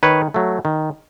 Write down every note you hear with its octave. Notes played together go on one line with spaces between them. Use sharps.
D#3 B4 C#5
F#3 A3
D#3